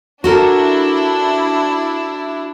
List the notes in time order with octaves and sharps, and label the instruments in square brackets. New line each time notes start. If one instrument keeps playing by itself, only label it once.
[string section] D4 E4 [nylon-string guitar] F#4 A4 A#4